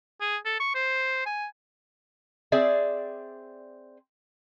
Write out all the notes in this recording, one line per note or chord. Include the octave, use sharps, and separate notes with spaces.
G#4
A4
C#6
C5
G#5
C4 G#4 D5 E5